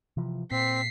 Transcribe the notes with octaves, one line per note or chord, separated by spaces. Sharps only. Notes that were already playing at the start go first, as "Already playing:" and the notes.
C3 E3 F3
A#2 C4 B6 C7